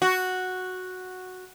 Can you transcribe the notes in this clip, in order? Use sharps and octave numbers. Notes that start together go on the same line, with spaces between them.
F#4